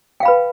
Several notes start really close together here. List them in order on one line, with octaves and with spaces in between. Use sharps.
G5 F5 B5 B4